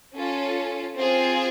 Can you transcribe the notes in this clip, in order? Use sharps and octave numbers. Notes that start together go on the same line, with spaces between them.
C#4 F4 A4
C4 F4 G#4